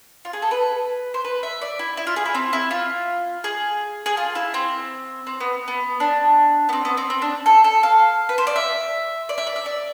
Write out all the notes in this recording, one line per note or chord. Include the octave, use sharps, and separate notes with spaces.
F4
G#4
A4
B4
C5
B4
E5
D5
E4
E4
F4
G#4
E4
C4
E4
F4
G#4
G#4
F4
E4
C4
C4
B3
B3
D4
B3
C4
B3
C4
C4
D4
A4
A4
F5
B4
C5
D5
E5
D5
E5
D5
E5
D5